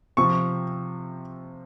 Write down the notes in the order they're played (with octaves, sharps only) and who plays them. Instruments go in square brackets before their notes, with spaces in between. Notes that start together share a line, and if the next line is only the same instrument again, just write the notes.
[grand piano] C3 F3 C#6